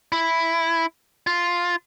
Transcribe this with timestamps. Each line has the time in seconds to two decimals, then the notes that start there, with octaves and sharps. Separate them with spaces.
0.12 E4
1.27 F4